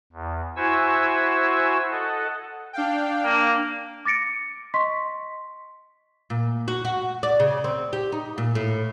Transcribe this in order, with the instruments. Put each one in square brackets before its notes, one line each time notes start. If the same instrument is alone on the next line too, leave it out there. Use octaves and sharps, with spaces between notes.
[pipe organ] E2
E4 F#4 C5 G#5 C#6 E6
A4 D#5 F#5
[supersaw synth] D4 F5 G5
[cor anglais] A#3
[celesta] D6 A6 A#6 C#7 D7
D#5 C6 C#6 B6
[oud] A#2
F#4
F#4
D5
C#3
C4
G4
D#4
A#2
A2